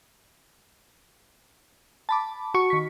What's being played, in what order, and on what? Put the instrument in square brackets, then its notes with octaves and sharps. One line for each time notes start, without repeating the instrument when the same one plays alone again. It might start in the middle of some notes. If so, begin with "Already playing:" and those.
[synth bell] A5 B5 D6
[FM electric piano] F#4 C#6
[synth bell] D#3 B6